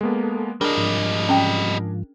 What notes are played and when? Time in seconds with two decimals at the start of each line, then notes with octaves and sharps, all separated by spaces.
0.01 G#3 A#3 B3 A4
0.61 G3 D4 G#4 A#4 D#5
0.77 G#2 F3
1.29 C#4 G5